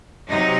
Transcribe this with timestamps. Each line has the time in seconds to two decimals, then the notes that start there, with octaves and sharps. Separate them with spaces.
0.28 C3 F#3 D#4